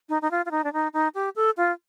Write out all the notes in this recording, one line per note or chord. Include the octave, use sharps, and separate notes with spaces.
D#4
D#4
F4
F4
D#4
D4
D#4
D#4
G4
A4
F4